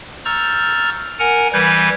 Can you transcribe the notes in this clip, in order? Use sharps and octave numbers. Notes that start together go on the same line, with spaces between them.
A#5 C#6 E6 F6 G6 A6
A#4 F#5 G#5 A#5
E3 G3 B4 G6 G#6